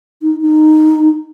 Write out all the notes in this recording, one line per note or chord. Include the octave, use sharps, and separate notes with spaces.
D#4
D#4